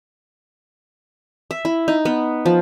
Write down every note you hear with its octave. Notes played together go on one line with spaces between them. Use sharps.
E5
E4
D#4
B3
F3